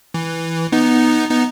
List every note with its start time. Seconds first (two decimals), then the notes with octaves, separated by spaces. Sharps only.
0.14 E3
0.72 B3 D#4
1.30 B3 D#4